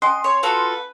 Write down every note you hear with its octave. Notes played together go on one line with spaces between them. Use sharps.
C#4 D#5 G#5 C6
C#5
F4 F#4 A4 B4